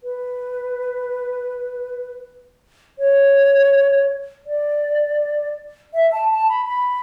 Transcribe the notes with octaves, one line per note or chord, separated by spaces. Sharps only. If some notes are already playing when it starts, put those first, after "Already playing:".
B4
C#5
D5
E5
A5
A5
B5
B5